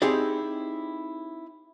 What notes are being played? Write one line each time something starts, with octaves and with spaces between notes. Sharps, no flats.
C4 D#4 E4 G4 G#4 D5